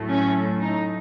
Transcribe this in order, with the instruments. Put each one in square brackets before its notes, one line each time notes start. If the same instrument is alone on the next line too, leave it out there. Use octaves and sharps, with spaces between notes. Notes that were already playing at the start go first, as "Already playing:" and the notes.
Already playing: [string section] A2 F#3 A3
C#4
D#4